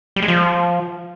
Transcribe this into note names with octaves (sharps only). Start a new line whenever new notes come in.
G3
G#3
F3